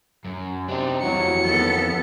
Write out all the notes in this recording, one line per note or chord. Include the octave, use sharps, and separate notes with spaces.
F#2
C3 D4 D#4
F2 E3 F#3 G3 C#7
D#2 B3 A4